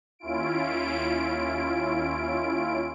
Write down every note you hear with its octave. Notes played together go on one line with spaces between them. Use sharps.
D#2 C#4 E4 F4 D7